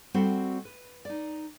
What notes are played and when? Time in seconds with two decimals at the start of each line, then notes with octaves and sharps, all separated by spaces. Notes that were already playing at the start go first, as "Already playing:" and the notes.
0.14 G3 C4 F#4 A4 C5 F#5
0.65 B4
1.05 D#4 D5